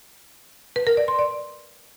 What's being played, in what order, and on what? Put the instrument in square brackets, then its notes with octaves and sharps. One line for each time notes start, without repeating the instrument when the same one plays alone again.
[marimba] B4
A#4
D5
C6
D5